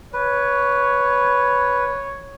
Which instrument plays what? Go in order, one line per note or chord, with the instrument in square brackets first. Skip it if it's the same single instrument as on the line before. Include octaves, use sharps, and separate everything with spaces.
[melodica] B4 [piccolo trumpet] C#5